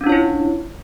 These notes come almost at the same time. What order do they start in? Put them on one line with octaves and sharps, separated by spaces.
C#4 D4 F4 C#5 E4